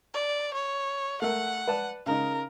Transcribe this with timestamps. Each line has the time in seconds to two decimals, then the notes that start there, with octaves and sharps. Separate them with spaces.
0.14 D5
0.54 C#5
1.22 A3 A#4 F#5
1.67 B4 D5 A5
2.06 C#3 D#4 A#4